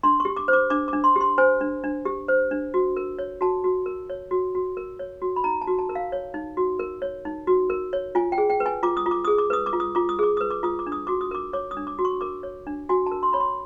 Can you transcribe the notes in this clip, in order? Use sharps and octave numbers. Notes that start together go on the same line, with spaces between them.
D4 C6
C#6
G4
D6
C5
D6
D4 D6
D6
D4
C6
G4 C6
C5 G#5
D4
D4
G4
C5
D4
F#4
A#4
C#5
F#4 A5
F#4
A#4
C#5
F#4
F#4
A#4
C#5
F#4
B5
D#4 A#5
A5
F#4
A5
A#4
F5
C#5
D#4
F#4
A#4
C#5
D#4
F#4
A#4
C#5
F4 G#5
G5
G#4
G5
B4
G#5
F4 D6
D#6
F4
D6
G#4 D#6
D6
B4 D#6
D6
F4
D#6
F4 D6
D#6
G#4 D6
B4 D#6
D6
F4 D#6
D6
D4
D#6
F#4 D6
D#6
A#4 D6
C#5 D6
D#6
D4
D6
F#4
C#6
A#4 D6
C#5
D4
F#4 G#5
A#4 A5
C6
C#5 B5
C6